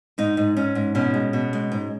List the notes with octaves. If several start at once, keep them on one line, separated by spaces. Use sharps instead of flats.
G#2 D#4
G#2
G#2 C#4
G#2
B2 C#4
G#3
B2
G#3
G#2